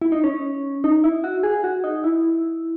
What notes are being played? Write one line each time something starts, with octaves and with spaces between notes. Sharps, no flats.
E4
D#4
C#4
D#4
E4
F#4
G#4
F#4
D#4
E4